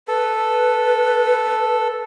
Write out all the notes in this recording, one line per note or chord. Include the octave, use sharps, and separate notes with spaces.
A4 B4